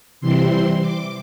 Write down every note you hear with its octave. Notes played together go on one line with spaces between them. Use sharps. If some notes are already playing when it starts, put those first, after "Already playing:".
C3 E3 G3 C4 E4 C6
D6